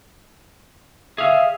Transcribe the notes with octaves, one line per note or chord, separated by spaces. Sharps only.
G#4 E5 F5